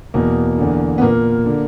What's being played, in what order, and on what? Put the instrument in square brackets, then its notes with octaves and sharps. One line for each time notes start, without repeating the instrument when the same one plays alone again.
[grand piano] E2 B2 A#3
E2 D3
B3
A#2 A#3
D3